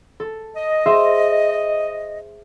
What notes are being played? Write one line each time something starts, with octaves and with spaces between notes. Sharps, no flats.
A4
D#5
G#4 C5 E5